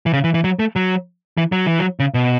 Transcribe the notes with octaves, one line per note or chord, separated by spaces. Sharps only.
E3
C#3
E3
E3
F#3
A3
F#3
E3
F#3
E3
F#3
C#3
B2